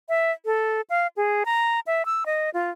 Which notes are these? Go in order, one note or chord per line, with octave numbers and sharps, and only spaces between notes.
E5
A4
F5
G#4
A#5
E5
E6
D#5
F4